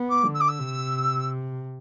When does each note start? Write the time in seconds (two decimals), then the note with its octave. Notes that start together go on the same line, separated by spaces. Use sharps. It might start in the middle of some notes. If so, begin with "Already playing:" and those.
Already playing: B3
0.09 D6
0.26 D3
0.34 E6
0.40 D6
0.48 E6
0.59 C3